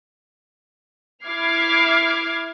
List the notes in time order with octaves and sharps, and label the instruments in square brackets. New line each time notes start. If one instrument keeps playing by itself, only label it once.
[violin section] E4 D6 F6 G#6 C7